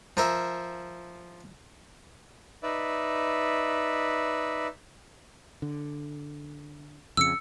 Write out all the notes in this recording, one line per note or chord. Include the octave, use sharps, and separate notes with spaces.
F3 A#4 E5
D#4 B4 D5 E5
D3
F2 C#3 E6 C#7